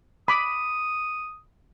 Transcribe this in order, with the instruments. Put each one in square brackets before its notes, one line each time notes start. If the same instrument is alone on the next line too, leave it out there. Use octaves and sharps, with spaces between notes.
[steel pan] B5 D6 [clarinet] D#6